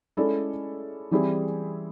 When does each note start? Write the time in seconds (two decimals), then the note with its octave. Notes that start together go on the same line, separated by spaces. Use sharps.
0.17 G#3 C#4 E4 A4 D5
1.11 E3 G3 C4 E4 G#4